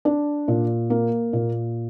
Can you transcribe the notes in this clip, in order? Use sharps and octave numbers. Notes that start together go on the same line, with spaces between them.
D4
A#2
A#3
A#2